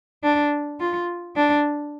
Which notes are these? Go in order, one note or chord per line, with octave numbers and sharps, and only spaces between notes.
D4
F4
D4